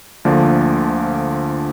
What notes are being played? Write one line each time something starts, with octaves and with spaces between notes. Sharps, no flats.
D2 D3 F3 A#3 D4